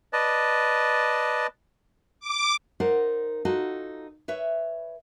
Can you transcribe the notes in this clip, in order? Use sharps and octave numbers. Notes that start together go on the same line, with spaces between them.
B4 D5 D#5 A5
D6
D#4 A#4 C5 D5 F#5
D#4 F4 F#4 A4
B4 C#5 E5